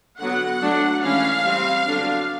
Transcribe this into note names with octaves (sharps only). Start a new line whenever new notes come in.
D3 F#3 B3 F#5
F#3 A3 D4
E3 G#3 C#4 F5
G3 C4
D3 F#3 B3 D4